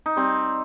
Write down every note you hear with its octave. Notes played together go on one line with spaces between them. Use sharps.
D#4
G3 C4